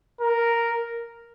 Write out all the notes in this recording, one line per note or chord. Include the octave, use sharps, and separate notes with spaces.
A#4